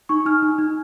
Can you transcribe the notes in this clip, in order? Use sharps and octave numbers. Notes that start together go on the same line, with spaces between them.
D#4 C#6
D#4 F6
D#4
D#4